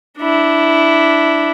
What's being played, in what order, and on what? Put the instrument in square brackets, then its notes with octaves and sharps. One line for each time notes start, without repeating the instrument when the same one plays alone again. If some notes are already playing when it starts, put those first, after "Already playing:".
[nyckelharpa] D4 E4